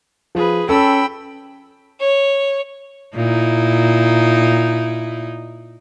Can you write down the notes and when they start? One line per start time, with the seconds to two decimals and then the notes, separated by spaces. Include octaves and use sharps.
0.35 F3 G#4 B4
0.69 C#4 A4 G5 B5 E6
2.00 C#5
3.15 A#2 D#4 E4